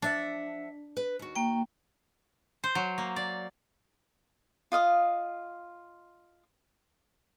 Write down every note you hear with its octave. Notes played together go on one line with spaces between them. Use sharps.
F3 D4 E5 F#5
B4
D#2 F#4
A#3 G5
C5
F#3
A#3
D5
F4 D#5 F5 D#6